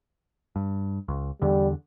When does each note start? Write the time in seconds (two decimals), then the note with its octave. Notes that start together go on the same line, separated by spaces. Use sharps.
0.56 G2
1.08 C#2
1.42 E2 D3 G3